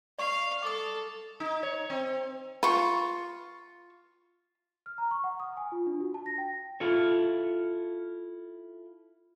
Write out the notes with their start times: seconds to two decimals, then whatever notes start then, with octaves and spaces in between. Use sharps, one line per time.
0.18 D5 F5 C#6
0.62 A4 D6 D#6
1.40 D#4
1.63 C#5
1.90 C4
2.63 F4 B4 C#6
4.86 F6
4.98 A#5
5.11 C#6
5.24 F#5
5.40 D#6
5.57 G#5
5.72 F4
5.87 D4
6.00 F#4
6.14 A5
6.26 A#6
6.38 G5
6.80 E4 F4 A4 C#5